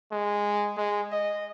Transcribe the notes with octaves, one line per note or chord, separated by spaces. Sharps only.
G#3
G#3
D#5